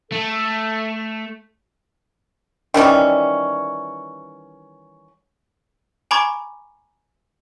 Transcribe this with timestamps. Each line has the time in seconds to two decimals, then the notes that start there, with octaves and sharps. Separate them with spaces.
0.12 A3 A4
2.74 D#3 E3 G3 C#4
6.11 G#5 A#5 B5 C#6 D6 G#6